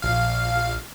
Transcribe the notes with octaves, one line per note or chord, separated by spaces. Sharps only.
A#1 F5